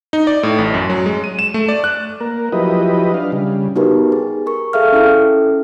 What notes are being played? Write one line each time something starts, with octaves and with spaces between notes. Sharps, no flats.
D#4
D5
A2
A1
F#2
F#3
G#3
D#7
E7
A3
D5
F#6
A#3 A#4
F3 F#3 E4 G4 B4 D#5
D4 F5
C#3 G3
B3 D#4 F#4 G4 A#4 B4
G#4
A#4 C#6
G#4 A4 E5 F5 F6
C#4 E4 A4